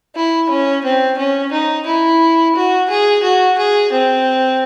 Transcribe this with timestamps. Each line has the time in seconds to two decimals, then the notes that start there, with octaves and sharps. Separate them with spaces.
0.16 E4
0.50 C#4
0.84 C4
1.18 C#4
1.52 D#4
1.86 E4
2.55 F#4
2.90 G#4
3.23 F#4
3.58 G#4
3.92 C4